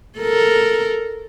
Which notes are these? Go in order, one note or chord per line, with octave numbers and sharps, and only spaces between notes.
A4 A#4